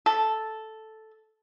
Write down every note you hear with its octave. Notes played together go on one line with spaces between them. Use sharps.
A4